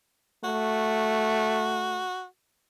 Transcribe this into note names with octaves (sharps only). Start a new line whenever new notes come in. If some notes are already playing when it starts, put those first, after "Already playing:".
A3 F#4